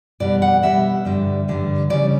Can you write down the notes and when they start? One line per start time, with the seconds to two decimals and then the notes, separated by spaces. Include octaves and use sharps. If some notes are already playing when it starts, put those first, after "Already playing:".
0.20 B2 G3 B3 D5
0.42 F#5
0.63 B2 G3 B3 E5
1.05 G2 D3 G3
1.48 G2 D3 G3
1.90 C#3 G3 C#4 D5